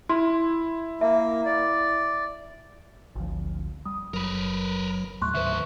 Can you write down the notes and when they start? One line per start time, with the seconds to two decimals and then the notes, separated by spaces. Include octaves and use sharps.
0.09 E4 C6
1.01 A#3 E5
1.45 D5
3.15 G#1 D2 F3
3.86 G3 D#6
4.14 F#1 F#3 A#4 B4
5.22 D#2 A2 F#3 A3 C6 C#6 F#6
5.34 D#3 B4 C5 E5